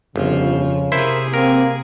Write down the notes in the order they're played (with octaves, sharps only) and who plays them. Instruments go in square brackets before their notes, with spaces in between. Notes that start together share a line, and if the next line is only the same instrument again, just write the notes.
[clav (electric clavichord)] G1 [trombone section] F2 C#3 [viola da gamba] F3
[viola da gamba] C3 G#4 [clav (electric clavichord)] E4 C5 E5 [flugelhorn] A#4
[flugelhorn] A#3 [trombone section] C4 [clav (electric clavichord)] A#4